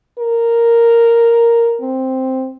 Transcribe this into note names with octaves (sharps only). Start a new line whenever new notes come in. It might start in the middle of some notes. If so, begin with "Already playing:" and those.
A#4
C4